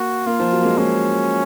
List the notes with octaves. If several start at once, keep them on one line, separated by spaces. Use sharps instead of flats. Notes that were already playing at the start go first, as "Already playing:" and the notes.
Already playing: A#3 F#4
A#3 F4
F3
F#3
A#3
G#3
G#3 C#4